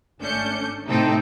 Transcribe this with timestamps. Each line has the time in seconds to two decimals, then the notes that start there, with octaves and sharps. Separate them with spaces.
0.20 G#1 A3 C#4 D4 G6 C#7
0.88 A2 C3 C4 D#4 A4 G5